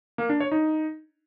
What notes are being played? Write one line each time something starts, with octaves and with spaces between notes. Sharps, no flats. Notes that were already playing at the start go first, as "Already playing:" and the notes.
A#3
D4
C#5
D#4